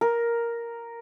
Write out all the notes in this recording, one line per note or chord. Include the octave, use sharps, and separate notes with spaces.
A#4